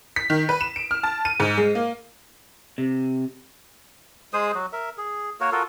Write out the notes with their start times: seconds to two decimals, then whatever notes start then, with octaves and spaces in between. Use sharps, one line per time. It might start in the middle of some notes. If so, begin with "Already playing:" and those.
0.16 B6
0.30 D#3
0.49 B4
0.61 E7
0.76 D7
0.91 F6
1.03 A5
1.25 D#7
1.40 G#2
1.57 G#3
1.75 A#3
2.78 C3
4.33 G#3 G#4 C5 D#6
4.55 F#3 F#4
4.73 A#4 E5
4.98 G#4
5.40 A#3 F#4 A#4 C#5
5.52 F4 F#4 A4 A#4